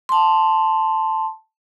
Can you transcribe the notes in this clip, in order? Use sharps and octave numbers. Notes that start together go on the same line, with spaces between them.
A5 C6